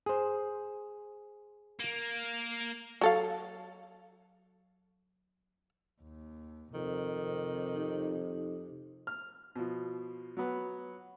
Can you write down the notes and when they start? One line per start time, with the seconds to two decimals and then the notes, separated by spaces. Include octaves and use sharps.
0.06 G#4 C5
1.80 A#3
3.01 F#3 A4 F5
6.01 D#2
6.74 F2 C3 D#3
7.75 D#4 G4
9.07 F6
9.56 B2 F3
10.37 F#3 B3 B4